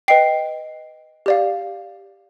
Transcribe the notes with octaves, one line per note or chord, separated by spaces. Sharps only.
B4 D#5 G5 C7
G4 D5 F5